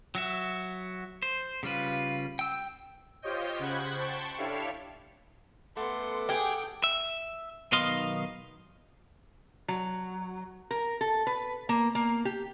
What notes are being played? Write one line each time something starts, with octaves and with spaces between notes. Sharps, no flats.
F#3 F#4 E5
C5
C#3 G3 F4 B4
G5 E6
F4 G4 C5 C#5 D#5 G5
C#3 C5 F#5 B5 F#6 G#6
C5 G5 A5 C#6
D4 E4 G4 A4 C#5 F5
A3 B3 A4 F#5 C6 D6
G4 G#4 G5
E5
B1 D#3 B3 D#5 F5 C6
F#3
A#4
A4
B4
A#3
A#3
G4